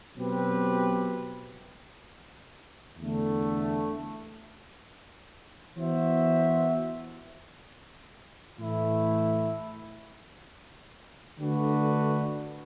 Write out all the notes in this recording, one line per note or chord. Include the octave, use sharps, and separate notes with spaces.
B2 F#3 C4 G4 B4
E2 D3 A3
E3 B3 F#4 C5 E5
A2 E3 A3 E4
D3 A3 D4 F#4 B4